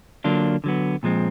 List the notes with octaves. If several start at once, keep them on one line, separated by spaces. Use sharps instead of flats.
D3 F#3 A#3 D4 F4
D3 F#3 B3
A#2 F3 G#3 C4